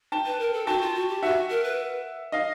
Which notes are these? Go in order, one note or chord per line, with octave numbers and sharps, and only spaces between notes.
G5 A5
B4
A#4
A4
F#4 G5 A5
F4
F#4
G4
F#4 E5 F#5
A#4
B4
D#5 F5